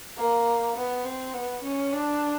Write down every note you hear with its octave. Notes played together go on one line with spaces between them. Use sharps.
A#3
B3
C4
B3
C#4
D4